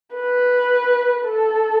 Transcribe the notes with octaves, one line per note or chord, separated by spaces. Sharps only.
B4
A4